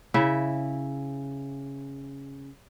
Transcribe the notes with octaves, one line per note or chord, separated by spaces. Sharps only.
C#3 E4 E5